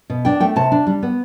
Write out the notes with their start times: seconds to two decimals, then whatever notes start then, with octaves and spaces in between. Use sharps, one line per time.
0.10 B2
0.25 D4 G5
0.40 A3 G5
0.56 C3 A5
0.72 D4
0.87 G3
1.03 B3